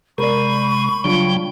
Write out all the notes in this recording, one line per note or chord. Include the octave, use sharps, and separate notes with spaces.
C3 G#3 A#4 D5 B5 C#6
C#3 F#3 G3 D4 F4 G5